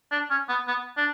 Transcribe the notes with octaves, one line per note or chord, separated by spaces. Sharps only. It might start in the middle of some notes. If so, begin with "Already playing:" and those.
D4
C#4
B3
B3
D4